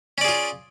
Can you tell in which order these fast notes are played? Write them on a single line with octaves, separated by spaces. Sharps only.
C#4 D5 G#4 F4